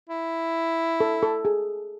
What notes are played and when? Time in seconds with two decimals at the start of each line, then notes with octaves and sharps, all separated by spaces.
0.10 E4
1.00 A4
1.23 A4
1.45 G#4